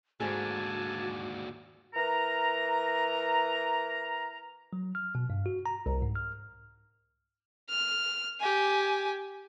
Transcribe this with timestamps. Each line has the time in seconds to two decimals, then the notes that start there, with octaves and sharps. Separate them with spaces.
0.20 D#2 G#2 D3 A3 F#4 G#4 G#5 A5
1.94 E3 A#4 A#5
4.73 F#3
4.95 F6
5.15 B2
5.30 G2
5.46 F#4
5.66 A#5
5.86 C2
6.02 G#2
6.16 F6
7.69 F6
8.40 G4 G#5